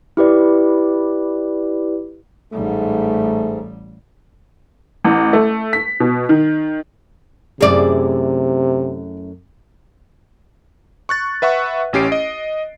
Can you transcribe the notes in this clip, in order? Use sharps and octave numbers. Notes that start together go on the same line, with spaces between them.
E4 G4 B4 D5
A1 G#2 G3 A3
A1
A3
B6
B2
D#3
F#2 C3 A3 E4 G#4 D5
C#6 F#6 A6
B4 E5 F#5 C#6
A1 C#4 G4 C7 D7
D#5